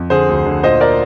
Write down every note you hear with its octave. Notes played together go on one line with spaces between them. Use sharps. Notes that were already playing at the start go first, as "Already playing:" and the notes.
Already playing: F2
D3 G#4 C5
D2
D3
A#2 C5 D#5
A#4 D5